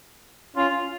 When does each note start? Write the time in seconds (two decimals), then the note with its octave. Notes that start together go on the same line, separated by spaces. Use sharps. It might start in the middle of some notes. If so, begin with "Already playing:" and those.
0.56 C#4 F4